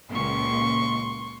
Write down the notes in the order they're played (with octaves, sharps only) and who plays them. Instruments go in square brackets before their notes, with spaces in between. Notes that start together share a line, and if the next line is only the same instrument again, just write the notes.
[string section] C#2 A#2 [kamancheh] C6 C#6